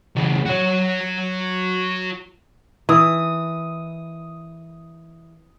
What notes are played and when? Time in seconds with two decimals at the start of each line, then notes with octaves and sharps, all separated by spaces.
0.16 C#3 E3
0.46 F#4 C#5
2.89 E3 D#6